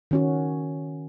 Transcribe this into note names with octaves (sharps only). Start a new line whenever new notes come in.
D#3 C#4 F#4